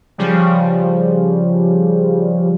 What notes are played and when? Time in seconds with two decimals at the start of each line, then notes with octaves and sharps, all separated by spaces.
0.18 C#3 F3 G3